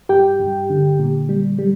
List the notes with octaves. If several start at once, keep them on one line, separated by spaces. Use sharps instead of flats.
G2 G4 G5
G2
D3
A#2
G3
G3